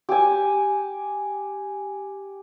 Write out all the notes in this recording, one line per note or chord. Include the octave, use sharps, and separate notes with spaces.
G4 G#5